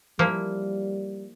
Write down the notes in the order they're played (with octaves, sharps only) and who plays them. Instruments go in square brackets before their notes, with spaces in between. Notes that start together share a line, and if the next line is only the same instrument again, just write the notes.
[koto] F3 A#3 E4 [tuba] G3